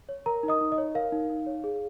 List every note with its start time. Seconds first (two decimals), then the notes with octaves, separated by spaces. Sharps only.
0.09 C#5
0.26 A#4 A#5
0.43 D#4
0.48 D#5 D#6
0.61 D#4
0.72 D#5
0.78 C#5
0.95 A#4 F5
1.12 D#4
1.30 D#4
1.46 C#5
1.64 G#4